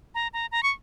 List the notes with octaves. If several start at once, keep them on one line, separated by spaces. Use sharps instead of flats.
A#5
A#5
A#5
C#6